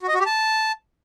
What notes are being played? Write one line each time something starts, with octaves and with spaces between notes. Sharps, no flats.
F#4
D#5
F#4
G4
A5